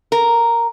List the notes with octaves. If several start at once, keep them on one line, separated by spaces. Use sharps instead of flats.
A#4